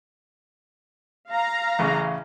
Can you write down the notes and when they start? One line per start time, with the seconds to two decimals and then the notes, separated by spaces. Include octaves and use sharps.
1.30 F5 A#5
1.79 A1 C#3